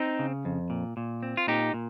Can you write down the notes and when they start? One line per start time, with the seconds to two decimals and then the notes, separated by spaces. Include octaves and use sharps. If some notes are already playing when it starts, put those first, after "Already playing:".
Already playing: C4 D#4
0.19 C#3
0.45 F2
0.70 A#2
0.97 A#2
1.23 C4
1.37 F4
1.47 A#2 D#4 G4
1.74 A#2